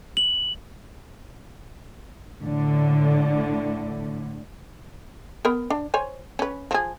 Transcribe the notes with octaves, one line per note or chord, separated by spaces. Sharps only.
F#7
A2 D3
B3 A#4
D4
C5 C#5 G#5
C#4 B4
F3 G#4